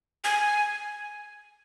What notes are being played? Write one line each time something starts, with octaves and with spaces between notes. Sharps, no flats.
G#5